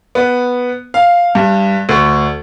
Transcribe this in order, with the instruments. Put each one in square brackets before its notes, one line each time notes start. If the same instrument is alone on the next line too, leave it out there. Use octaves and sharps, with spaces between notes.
[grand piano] B3
F5
G2
D2